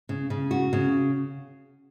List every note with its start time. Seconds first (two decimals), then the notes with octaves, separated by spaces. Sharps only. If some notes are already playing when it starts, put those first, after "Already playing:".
0.09 C#3
0.30 C#3
0.51 F#4
0.73 C#3